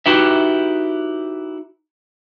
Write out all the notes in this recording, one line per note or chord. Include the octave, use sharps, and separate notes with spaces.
D#4 E4 F#4 G4 B4 E5